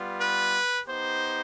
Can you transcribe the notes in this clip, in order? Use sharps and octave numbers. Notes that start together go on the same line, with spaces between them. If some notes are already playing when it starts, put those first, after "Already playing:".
Already playing: G3 B3 F4
B4
B3 D#4 G4 C5